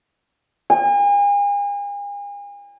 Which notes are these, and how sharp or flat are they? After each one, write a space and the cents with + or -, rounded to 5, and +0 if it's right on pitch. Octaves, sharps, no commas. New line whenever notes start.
G#5 -40